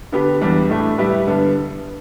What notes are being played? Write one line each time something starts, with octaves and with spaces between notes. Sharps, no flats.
D3 B3 G4 B4
E2 E3 G3 B3 D4
A2 A3 D4
G3 E4 G4 B4
G2 D3 B3